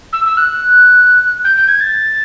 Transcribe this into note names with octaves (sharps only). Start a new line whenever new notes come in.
E6
E6
F#6
G6
G6
G#6
A6